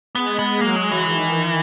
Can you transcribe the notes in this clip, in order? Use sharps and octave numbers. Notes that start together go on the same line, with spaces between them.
G#3 B3
B3
F#3 A#3
G#3
E3
D#3